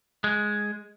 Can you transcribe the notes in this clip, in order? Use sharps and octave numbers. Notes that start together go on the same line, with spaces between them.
G#3